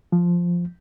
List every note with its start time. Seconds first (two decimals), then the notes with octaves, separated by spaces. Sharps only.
0.12 F3